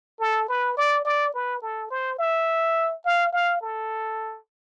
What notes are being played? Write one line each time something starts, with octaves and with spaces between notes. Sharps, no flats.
A4
B4
D5
D5
B4
A4
C5
E5
F5
F5
A4